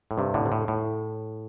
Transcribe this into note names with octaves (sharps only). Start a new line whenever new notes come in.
A2
G2 C3
A2 D3
C3
A2
A2